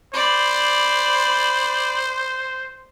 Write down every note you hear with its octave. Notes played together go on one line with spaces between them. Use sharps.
C5 D5 B5